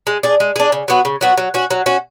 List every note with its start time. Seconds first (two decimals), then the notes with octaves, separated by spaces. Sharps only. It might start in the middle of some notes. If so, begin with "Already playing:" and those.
0.07 G#3
0.23 D4 G#4
0.40 G#3
0.56 D4 G#4
0.72 C#3
0.88 F#3 B3 F#4
1.05 C#3
1.21 F#3 B3 F#4
1.38 F#3
1.54 C#4 F#4
1.71 F#3
1.86 C#4 F#4